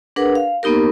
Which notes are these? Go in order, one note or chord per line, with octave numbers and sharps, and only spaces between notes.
D4 G#4 A#4 B4 F#5
F5
A#3 B3 D#4 G4 A#4